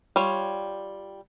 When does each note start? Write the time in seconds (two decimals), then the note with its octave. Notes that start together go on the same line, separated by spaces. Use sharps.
0.16 G3 F4 C#5